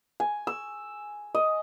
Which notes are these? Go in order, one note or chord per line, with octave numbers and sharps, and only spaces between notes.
G#5
E6
D#5